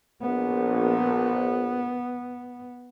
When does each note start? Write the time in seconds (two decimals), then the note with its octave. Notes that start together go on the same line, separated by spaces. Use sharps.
0.21 A#1 B3